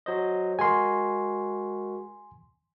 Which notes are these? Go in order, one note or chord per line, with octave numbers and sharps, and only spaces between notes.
F#3 C5 D#5
G#3 F#4 A#4 G#5 C6